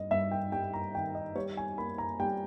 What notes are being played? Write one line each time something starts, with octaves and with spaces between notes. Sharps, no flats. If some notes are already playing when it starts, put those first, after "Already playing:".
Already playing: G2 D#5
G2 E5
G5
G3 G5
A#5
D#3 G5
D#5
G3 C#5
G#5
A#3 B5
A#5
G3 G5